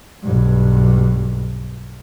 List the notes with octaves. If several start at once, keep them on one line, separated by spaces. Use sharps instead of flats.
B1 G2